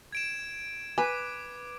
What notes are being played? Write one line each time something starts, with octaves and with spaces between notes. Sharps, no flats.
G#6 D7 E7
B4 G#5 D6